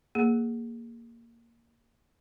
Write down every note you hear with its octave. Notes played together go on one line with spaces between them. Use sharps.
A#3 G#4